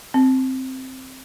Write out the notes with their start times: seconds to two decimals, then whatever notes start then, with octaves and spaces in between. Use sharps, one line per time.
0.14 C4